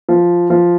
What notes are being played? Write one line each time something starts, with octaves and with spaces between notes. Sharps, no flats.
F3
F3